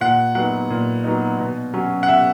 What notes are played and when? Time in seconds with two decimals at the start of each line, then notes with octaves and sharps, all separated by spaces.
0.01 A#2 F#5
0.35 F#3 B3 D#4 F#5
0.70 A#2
1.04 F#3 B3 D#4
1.40 B2
1.74 F#3 C#4
2.03 F#5
2.09 B2 E5